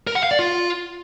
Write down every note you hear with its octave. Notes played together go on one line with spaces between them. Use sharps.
A#4
F#5
F5
D5
F4